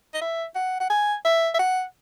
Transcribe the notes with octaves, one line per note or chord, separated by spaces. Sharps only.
D#5
E5
F#5
F#5
G#5
E5
E5
F#5